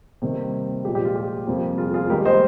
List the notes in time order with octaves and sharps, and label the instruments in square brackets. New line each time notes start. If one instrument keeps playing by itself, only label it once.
[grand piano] C3 D#3 G3 A#3
A#2 F3 G#3 G4
G4
F4
G4
F2 C3 G3 A#3
F4 G#4
F4 G#4
G#2 D#3 G3 A#3 G4 A#4
C5 D#5